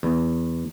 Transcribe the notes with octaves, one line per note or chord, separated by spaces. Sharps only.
E2